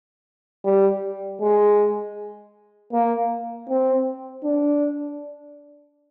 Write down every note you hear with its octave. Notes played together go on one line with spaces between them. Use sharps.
G3
G#3
A#3
C4
D4